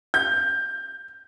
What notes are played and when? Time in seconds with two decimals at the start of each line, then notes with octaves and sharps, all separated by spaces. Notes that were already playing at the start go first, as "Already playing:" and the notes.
0.14 G6